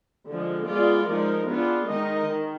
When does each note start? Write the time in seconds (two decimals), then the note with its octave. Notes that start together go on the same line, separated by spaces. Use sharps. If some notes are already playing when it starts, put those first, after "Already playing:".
0.29 D3 F3 G#3
0.68 G#3 B3 F4 G#4 D5
1.08 F3 G#3 D#4 A#4
1.48 B3 D4 F4 G#4
1.88 D#3 G#3 D#4 A#4 D#5
2.28 D#3